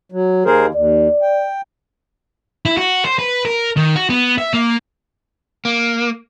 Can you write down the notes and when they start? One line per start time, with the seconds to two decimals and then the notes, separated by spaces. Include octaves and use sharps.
0.12 F#3
0.45 D#2 G#4 A#4 C5
0.74 D#2 D5
1.22 G5
2.65 E4
2.77 F#4
3.06 C5
3.19 B4
3.45 A#4
3.77 D#3
3.95 F#4
4.10 B3
4.38 E5
4.54 A#3
5.65 A#3